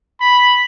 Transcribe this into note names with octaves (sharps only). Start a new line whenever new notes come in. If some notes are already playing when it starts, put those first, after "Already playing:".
B5